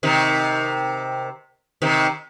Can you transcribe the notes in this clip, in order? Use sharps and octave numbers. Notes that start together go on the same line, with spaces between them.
C3 D#3
C3 D#3